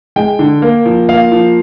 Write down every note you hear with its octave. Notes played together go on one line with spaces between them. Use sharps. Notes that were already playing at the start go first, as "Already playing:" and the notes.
G#3 G5
D3
A#3
F3
A#3 F5
F3